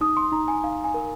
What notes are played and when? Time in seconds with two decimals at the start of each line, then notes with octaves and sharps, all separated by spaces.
0.01 D#4 D#6
0.17 C6
0.32 D#4 A#5
0.48 G#5
0.63 D#4 F5
0.84 G#5
0.94 A#4